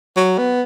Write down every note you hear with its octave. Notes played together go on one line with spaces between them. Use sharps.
F#3
B3